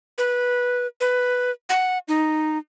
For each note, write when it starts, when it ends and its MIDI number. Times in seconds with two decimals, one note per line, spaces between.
0.18 0.87 71
1.01 1.51 71
1.69 1.98 78
2.08 2.58 63